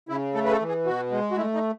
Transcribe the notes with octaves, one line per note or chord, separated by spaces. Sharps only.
C#3 E4
A3 A4
B4
A4
E3
G#4
B2 F#4
G#3
F#4
A3 E4
D#4